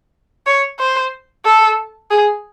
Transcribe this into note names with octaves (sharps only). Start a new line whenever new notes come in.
C#5
C5
A4
G#4